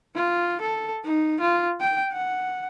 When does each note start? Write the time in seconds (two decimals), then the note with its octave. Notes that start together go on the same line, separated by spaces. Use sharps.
0.16 F4
0.61 A4
1.04 D#4
1.41 F4
1.81 G5
2.13 F#5